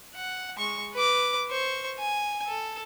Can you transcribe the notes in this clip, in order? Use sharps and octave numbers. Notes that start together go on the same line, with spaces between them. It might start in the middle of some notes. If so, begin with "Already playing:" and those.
F#5
G#3 C#6
B4 D6
C5 C#6
G#5
A4